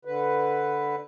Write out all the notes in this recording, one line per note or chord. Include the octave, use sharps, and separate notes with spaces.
D3 B4